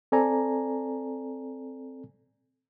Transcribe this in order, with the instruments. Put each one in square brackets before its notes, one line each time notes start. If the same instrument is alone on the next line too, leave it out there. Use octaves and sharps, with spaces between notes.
[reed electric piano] C4 A4 D5 G#5 A#5